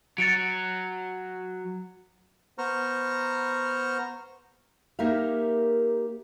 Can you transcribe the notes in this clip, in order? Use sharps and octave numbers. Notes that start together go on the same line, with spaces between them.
F#3 A6 C#7 D7
B3 C5 A#5 C#6 F6
A#3 D#4 G4 A#4 E5 F5